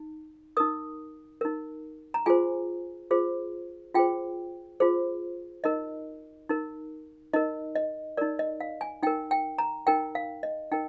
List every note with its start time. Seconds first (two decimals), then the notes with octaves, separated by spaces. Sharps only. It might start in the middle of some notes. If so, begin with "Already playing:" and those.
Already playing: D#4
0.57 D#4 A#4 D#6
1.41 D#4 A#4
2.14 A#5
2.26 F4 G#4 C5 G#5
3.11 F4 G#4 C5
3.94 F4 G#4 C5 G5
4.80 F4 G#4 C5
5.64 D#4 A#4 D#5
6.49 D#4 A#4
7.33 D#4 A#4 D#5
7.75 D#5
8.17 D#4 A#4 D5
8.39 D#5
8.60 F5
8.81 G#5
9.03 D#4 A#4 G5
9.31 G5
9.58 A#5
9.87 D#4 A#4 G5
10.15 F5
10.43 D#5
10.72 D#4 A#4 G5